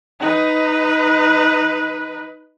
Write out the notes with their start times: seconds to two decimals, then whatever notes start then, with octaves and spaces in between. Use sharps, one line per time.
0.20 D#4 B4